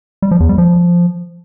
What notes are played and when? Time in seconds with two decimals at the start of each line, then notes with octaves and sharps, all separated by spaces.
0.22 G3
0.31 F3
0.40 E2
0.49 G3
0.58 F3